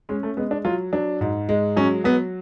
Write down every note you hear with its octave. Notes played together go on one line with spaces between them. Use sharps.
G#3 C#4
A3
G#3 B3
D4
F#3 F4
F#3 D4
G#2
G#3
F#3 C#4
F#3 B3